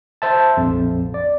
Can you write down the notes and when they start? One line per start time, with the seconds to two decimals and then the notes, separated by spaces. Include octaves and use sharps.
0.22 C5 E5 A5
0.57 A#1 F2
1.14 D5